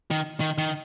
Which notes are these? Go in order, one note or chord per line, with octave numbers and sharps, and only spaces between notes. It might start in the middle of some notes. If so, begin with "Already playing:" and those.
D#3
D#3
D#3